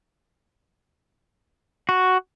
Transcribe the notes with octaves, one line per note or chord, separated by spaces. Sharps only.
F#4